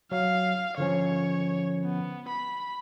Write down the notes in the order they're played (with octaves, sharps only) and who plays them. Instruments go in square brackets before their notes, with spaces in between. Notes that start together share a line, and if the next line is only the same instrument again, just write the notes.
[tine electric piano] F#3 [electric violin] F5
[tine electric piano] D3 F3 C#4 [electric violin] C#5
[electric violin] B3
B5